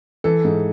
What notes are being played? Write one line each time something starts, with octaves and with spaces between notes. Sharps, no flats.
E3 A4
G#2